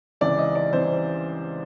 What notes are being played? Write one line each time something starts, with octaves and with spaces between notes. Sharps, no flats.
C#2 C3 E3 D5
D#5
D5
C3 E3 C5